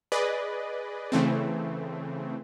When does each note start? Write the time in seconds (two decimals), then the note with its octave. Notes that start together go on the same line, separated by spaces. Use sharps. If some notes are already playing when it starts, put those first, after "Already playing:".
0.12 G#4 B4 D5 D#5
1.12 C#3 E3 A3 C4